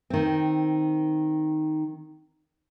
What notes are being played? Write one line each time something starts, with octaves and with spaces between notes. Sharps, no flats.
D#3 C4